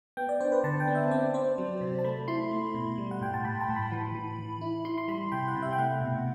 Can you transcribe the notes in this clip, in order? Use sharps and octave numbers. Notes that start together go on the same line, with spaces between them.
B3 G5
D5
D4 C5
B4
D3 A5
G5
B3
E5
C4 D5
C4 C5
F#3
C3
A5
A3 B5
E4 C6
A3
B2
G3
F#5
A2 G5
A5
A2 B5
A5
A2
B5
E3
E3
E3
E4
E4 C6
C6
G3 B5
C3 G5
F#5
C3
E5
G5
A3 F#5
B2